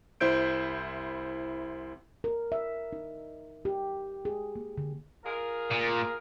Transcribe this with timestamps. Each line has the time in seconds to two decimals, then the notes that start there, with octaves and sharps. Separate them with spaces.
0.20 C2 E4 C5 G6 D7
2.24 A#4
2.52 E5
2.93 D#4
3.65 G4
4.25 G#4
4.56 A#3
4.78 D3
5.25 F4 G#4 A#4
5.71 A#2